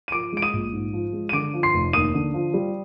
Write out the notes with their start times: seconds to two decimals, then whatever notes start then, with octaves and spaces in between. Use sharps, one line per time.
0.08 D#7
0.12 F3 D6 D7
0.32 G#3 D7
0.42 D#6 D#7
0.53 A#1
0.72 G#2
0.93 F3
1.13 G#3
1.29 D#7
1.33 D3 D6 D7
1.53 F3
1.63 C6 C7
1.74 F1
1.93 D#2 D#6 D#7
2.14 D3
2.34 F3
2.54 G3